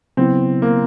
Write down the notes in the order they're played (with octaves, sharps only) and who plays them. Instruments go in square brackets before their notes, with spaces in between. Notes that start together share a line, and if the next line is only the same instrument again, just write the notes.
[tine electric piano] C#3 F#3 B3 E4 [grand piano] C4
[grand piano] A#3